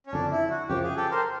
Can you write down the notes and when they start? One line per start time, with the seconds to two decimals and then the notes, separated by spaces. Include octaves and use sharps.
0.07 C#4
0.13 F#1 F2 D3 D4
0.31 E4
0.50 F#4
0.69 F#2 C#3 F3 G4
0.83 G#4
0.96 G4 A4
1.11 A#4 C5